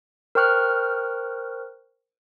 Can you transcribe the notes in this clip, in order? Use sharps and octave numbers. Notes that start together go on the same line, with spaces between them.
A#4 C5 G5 C#6 F6 F#6